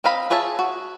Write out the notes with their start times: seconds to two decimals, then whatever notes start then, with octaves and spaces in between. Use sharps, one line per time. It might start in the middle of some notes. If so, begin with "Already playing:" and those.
0.04 C4 D#5 F5 B5
0.30 F4 G#4 C#5 E5 A5
0.59 F#4